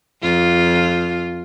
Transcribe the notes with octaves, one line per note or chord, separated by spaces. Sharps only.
F2 F4